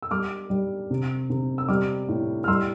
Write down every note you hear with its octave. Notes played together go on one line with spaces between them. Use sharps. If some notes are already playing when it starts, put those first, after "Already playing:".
E6
G3 D6 F6
G3
C3
C3
E6
G3 D6 F6
A2
F6
G3 C6 E6